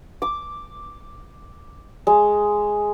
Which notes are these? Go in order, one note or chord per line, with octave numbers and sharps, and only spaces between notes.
D6
G#3